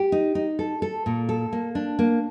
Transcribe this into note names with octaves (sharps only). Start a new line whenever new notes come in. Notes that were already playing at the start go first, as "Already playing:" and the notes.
Already playing: G4
D#4
D#4
A4
A4
A#2
A4
A#3
D4
A#3